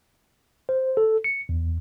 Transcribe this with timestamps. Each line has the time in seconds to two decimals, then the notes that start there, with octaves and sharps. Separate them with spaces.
0.69 C5
0.97 A4
1.24 C#7
1.49 E2